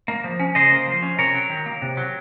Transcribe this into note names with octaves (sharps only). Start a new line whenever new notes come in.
A#3
F3
C#4
C#3 C5 D#5
A#3
F3
C#4
C3 A#4 C#5
F#3
D#3
A#3
C3
F#3